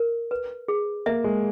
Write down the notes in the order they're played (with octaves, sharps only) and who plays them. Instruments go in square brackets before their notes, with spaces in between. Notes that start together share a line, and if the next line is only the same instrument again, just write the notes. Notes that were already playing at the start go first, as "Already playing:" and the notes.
Already playing: [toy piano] A#4
B4
G#4
[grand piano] A#3 [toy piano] E5
[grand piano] G#3